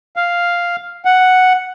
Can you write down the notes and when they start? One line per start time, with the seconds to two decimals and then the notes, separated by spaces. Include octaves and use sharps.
0.16 F5
1.05 F#5